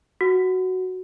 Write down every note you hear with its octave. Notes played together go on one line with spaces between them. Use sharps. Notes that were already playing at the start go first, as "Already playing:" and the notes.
F#4